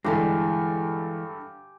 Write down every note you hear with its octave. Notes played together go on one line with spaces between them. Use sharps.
G2 D3 E3 G#3 G4 A4 G#5